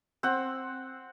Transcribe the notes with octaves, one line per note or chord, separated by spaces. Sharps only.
C4 F#5